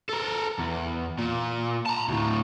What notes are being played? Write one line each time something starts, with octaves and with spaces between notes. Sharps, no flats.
A4 A#4
E2
A#2
A5 A#5
D2 A2